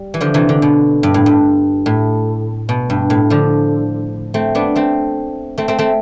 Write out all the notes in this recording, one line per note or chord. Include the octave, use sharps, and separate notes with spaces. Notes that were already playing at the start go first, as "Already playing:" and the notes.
Already playing: G3
E3
D3 F3
C3 E3
D3
B2
G2
A2
G2
A2
B2
G2
A2
D3 F3
A3 C4
B3 D4
A3 C4
A3 C4
A3 C4
A3 C4